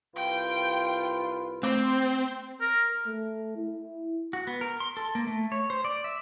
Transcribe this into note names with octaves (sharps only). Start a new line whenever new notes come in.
C2 F4 B4 G5
A3 C4 C5 D6
A#4
A3
E4
F#4
B3
A#4
C6
A4
A#3
A3
C#5
C5
D5
E5